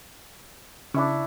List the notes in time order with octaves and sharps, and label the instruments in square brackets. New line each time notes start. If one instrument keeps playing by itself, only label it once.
[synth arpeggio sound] C#3 [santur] D4 E4 C#6